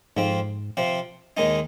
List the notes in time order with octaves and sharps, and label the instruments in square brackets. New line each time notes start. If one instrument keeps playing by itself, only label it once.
[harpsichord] F2 F3 C4 [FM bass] G#2
[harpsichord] C3 F3 C4
D#2 D#3 G#3 D#4